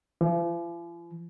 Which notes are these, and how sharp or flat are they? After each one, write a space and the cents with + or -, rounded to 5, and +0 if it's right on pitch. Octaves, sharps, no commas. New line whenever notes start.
F3 -45